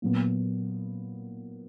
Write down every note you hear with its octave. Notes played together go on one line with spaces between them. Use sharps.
A#2 F#3 B3